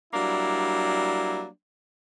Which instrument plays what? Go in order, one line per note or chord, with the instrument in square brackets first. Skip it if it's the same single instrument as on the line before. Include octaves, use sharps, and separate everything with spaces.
[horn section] F#3 G3 A#3 D4 E4